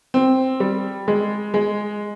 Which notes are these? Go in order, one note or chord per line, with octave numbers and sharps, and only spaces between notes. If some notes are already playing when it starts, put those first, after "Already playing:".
C4
G3
G#3
G#3